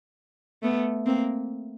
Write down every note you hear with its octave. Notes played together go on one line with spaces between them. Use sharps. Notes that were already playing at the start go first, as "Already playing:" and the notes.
A3 B3
A#3 C4